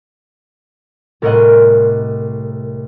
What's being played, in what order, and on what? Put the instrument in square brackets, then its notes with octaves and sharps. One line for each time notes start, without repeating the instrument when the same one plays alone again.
[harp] C2 A2 A#4 C#5 D#5 F#5